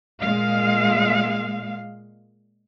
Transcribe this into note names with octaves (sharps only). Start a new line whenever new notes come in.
A#2 G#3 F5